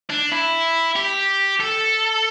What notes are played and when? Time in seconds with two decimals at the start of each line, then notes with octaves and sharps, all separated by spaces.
0.10 D4
0.32 E4
0.96 G4
1.60 A4